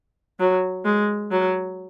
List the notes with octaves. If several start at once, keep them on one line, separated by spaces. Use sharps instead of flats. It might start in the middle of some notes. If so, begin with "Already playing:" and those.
F#3
G#3
F#3